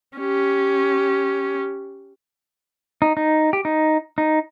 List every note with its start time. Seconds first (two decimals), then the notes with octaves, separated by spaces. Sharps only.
0.18 C#4 G4
3.02 D#4
3.17 D#4
3.53 G4
3.65 D#4
4.18 D#4